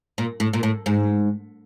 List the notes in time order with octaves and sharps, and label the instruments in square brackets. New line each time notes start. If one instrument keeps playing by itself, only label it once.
[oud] A#2
A2
A#2
A2
G#2